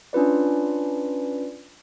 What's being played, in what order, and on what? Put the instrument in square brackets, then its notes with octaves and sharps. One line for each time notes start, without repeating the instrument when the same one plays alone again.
[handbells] C#4 D4 F4 B4 D5